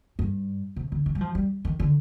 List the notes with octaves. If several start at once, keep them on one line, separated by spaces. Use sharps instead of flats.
G2
C3
D3
D#3
G3
F3
G3
D#3
D3